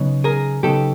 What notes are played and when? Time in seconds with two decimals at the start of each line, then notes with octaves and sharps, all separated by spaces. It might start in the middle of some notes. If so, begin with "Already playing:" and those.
Already playing: C#3 F#3 B3 D#4
0.24 G#4 A#4
0.63 C#3 F#3 B3 D#4 G4 A4